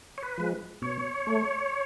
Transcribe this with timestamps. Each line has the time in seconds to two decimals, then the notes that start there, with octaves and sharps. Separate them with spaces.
0.18 C#5
0.22 B4
0.38 F3 G#3
0.82 B2 C#5
1.27 A3